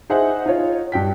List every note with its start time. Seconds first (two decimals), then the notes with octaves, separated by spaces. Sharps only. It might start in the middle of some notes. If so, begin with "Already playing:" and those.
0.10 D#4 G#4 C5 E5 F#5
0.46 D#4 F4 C#5
0.92 G2 G5 B6